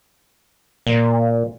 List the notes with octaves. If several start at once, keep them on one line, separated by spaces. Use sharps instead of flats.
A#2